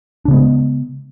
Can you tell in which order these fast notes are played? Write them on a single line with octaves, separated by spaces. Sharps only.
D4 C#3 B3 G#3